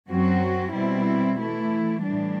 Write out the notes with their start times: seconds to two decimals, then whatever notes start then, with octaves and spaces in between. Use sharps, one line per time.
0.08 F#2 F#3 C4 F#4
0.73 B2 G3 C4 E4
1.38 E3 A3 E4
2.02 A2 E3 G3 D4